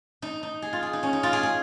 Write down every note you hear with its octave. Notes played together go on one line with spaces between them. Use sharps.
D#4
D#4
G#4
F4
G#4
D#4
C#4
D#4
F4
G#4
G#4